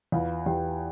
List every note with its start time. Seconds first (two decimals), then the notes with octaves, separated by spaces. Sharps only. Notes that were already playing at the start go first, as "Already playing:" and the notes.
0.12 E2 F4 F5
0.46 E2 G4 G5